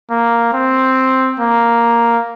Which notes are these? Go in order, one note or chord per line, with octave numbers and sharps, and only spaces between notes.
A#3
C4
A#3